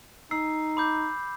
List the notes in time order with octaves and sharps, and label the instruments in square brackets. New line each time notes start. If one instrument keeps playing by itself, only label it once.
[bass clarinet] D#4 [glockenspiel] E6 C7
[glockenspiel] B5 D6 G6